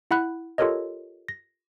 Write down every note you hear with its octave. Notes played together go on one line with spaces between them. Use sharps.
E4 F#5 B5 F#6
F4 G4 A4 A#4 C#5 D#5
A#6